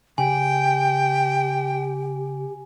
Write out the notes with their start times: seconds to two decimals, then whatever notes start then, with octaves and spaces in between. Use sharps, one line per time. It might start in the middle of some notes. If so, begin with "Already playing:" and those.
0.18 C#3 G4 G5 G#5